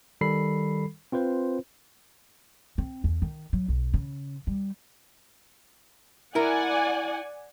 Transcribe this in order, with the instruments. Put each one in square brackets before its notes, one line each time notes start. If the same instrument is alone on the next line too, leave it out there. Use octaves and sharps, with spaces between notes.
[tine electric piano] D#3 G3 A4 B5 C7
C4 F4 B4 C5
[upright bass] C4
E2
D#3
F#3
B1
C#3
G3
[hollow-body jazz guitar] E4 A#4 [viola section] D5 F#5 G#5